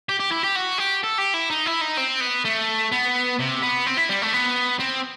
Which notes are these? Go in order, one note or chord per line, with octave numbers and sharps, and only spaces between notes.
G4
G4
E4
G4
F#4
G4
A4
G4
E4
D#4
E4
D#4
C4
B3
A3
B3
C3
B3
C4
E4
G3
A3
B3
C4